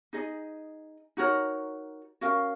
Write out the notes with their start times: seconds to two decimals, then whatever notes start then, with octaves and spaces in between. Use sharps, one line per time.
0.13 D#4 G#4 D#5
1.17 D#4 F#4 A#4 C#5
2.21 C#4 F#4 A#4 F5